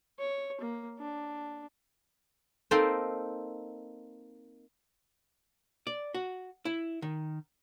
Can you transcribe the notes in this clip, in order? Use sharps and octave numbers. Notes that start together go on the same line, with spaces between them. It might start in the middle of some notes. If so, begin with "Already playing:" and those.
C#5
A#3
D4
A#3 C4 D#4 A4 C5
D5
F#4
E4
D#3